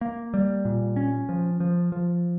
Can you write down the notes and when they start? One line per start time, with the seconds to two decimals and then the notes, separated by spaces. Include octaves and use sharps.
0.01 A#3
0.34 G3
0.65 A#2
0.96 C#4
1.29 F3
1.60 F3
1.92 F3